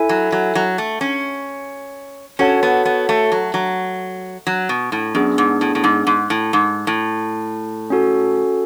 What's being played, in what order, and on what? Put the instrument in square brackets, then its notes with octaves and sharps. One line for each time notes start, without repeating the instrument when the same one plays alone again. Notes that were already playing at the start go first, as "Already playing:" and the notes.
Already playing: [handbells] E4 A4 E5 G#5
[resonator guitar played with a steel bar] F#3
F#3
F#3
A3
C#4
[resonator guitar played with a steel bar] C#4 [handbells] F#4 A4 C#5 F#5 A5
[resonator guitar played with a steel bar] B3
B3
A3
F#3
F#3
F#3
B2
A2
[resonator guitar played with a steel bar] F#2 [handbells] B3 D4 G#4
[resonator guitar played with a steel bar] G#2
A2
A2
G#2
G#2
A2
G#2
A2
[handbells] C#4 F#4 A4